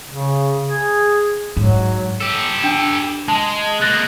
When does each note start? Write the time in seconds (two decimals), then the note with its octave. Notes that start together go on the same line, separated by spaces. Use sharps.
0.09 C#3
0.65 G#4
1.57 G#2 F#3
2.20 G4 A4
2.64 D4 G5
3.28 G#3 A5
3.81 G#3 A#3 F#6 A6 A#6